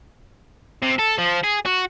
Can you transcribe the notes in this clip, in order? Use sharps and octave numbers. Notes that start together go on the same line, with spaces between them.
C3
A4
F3
G#4
F#4